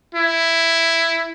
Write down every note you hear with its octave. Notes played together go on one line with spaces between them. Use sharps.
E4